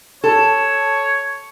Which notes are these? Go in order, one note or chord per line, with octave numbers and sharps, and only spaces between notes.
A4 C#5